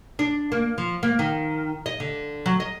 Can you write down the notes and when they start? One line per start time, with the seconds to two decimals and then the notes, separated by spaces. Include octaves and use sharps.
0.19 D4
0.52 A#3
0.78 F3
1.03 A#3
1.19 D#3
1.86 D#5
2.00 D3
2.46 F#3
2.60 D#5